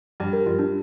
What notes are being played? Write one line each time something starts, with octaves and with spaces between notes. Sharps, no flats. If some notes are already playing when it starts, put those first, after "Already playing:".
G2 G4
A#4
G2 F4
D4